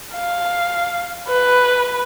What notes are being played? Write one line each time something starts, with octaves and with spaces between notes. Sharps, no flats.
F5
B4